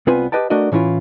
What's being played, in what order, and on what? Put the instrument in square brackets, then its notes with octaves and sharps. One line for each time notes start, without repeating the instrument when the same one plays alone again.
[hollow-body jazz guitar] C2 B3 C4 F4 B4 G#5
G4 B4 D#5 G5 A5
A3 D4 F#4 A#4 D#5
A2 E3 C#4 E4 F4